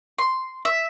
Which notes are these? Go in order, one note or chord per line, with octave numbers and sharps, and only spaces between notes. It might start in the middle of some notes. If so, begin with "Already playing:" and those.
C6
E5